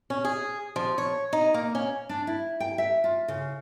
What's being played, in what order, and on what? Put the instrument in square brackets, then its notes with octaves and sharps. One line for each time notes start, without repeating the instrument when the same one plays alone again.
[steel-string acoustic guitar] C#4
G#4
F3
C#5
D#4
A#3
C#4
[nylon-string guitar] D4
E4
G5
E5
F4
C#3